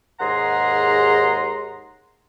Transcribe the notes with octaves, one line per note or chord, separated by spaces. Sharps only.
D#2 G#2 G#4 F#5 A#5 C6